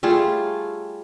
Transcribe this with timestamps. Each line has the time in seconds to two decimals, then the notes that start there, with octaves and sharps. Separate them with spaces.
0.03 G3 A3 F4 G#4